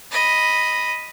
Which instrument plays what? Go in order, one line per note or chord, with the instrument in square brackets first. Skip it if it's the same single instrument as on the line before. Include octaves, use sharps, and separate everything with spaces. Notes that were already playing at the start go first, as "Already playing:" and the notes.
[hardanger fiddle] D#5 B5